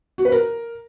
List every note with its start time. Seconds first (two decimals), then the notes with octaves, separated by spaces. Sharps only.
0.18 F#4
0.25 B4
0.32 A#4